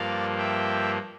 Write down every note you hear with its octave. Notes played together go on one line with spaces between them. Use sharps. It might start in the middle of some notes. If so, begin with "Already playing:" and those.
Already playing: G2 F3 A#3 D5 F5
E5 G5